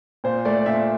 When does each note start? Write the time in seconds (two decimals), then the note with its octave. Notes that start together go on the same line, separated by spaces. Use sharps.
0.24 A#2 C5
0.45 A3 D5
0.57 D5
0.66 A#2 E5